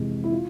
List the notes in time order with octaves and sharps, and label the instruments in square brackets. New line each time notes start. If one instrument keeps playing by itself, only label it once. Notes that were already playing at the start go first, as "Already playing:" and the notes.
Already playing: [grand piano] F2 C3 E3 G#3
E4
F4